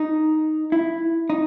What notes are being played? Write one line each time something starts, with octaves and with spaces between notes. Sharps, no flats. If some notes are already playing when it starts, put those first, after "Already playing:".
Already playing: D#4
E4
D#4